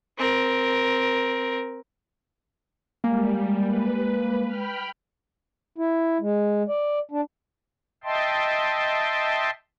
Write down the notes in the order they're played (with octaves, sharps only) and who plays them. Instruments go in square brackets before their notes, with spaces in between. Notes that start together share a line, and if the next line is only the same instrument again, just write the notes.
[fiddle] C4 A#4
[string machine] G3 [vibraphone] G#3 [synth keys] A#3
[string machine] B4
G5 B5 F6
[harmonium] E4
G#3
D5
D4
[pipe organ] D#5 E5 G5 A5 C6